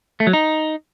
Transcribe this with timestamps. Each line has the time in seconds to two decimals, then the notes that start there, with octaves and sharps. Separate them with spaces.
0.20 A3
0.27 F#3
0.33 D#4